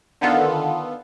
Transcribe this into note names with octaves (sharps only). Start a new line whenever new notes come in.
D3 D#3 B3 F4 A4